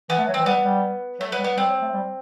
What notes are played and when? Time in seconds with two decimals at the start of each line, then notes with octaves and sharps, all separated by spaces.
0.09 E3 B3
0.18 A3
0.28 F#3
0.34 E3 C4
0.46 G3 B3
0.65 G3
1.20 F#3 A3
1.32 F#3 B3
1.39 G3
1.44 B3
1.57 G3 C4
1.69 F#3
1.82 A3
1.94 G3